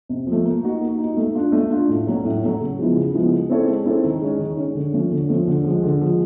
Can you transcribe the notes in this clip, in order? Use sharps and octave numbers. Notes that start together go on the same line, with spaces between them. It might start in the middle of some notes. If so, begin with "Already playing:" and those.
C3
F3
A3
A#3
D#4 F#4
A#3
D#4 F#4
A3
D4 F4
A3
D4 F4
A2
F#3 A3 C#4
A2
F#3 A3 C#4
C#3
F3 G#3 B3 E4
C#3
F3 G#3 B3 E4
G#3
C4 E4 A4 C#5
G#3
C4 E4 A4 C#5
D#3
G#3 C#4
D#3
G#3 C#4
D3
F3 A3 C#4
D3
F3 A3 C#4
D3
F3 G#3
D3
F3 G#3